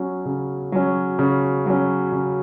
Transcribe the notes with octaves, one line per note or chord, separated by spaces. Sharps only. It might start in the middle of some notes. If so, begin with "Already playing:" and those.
Already playing: F#3 C#4
C#3
F#3 C#4
C#3
F#3 C#4
C#3